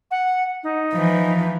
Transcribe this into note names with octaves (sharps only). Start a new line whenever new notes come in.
F#5
D#4
E3 F3